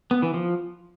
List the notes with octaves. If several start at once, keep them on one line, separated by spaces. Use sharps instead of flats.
B3
E3
F3